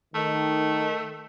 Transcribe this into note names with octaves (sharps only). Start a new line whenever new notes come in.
D#3 A3